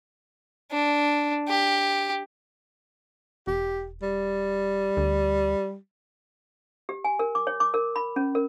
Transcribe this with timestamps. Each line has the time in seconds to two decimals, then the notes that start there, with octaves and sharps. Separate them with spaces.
0.72 D4
1.48 G4
3.47 E1 G4
4.03 G3
4.97 D2
6.89 G4
7.04 G#5
7.19 A#4
7.35 D6
7.47 C#5
7.60 D6
7.74 A#4
7.96 B5
8.16 C#4
8.35 A#4